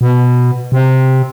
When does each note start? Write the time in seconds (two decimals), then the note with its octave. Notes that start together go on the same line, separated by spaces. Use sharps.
0.01 B2
0.72 C3